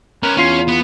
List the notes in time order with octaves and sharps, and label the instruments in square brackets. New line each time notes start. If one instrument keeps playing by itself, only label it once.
[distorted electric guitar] C#4 B4 [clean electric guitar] A#4
[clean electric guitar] E2 F4 C6 [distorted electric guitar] C#4
[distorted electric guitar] B3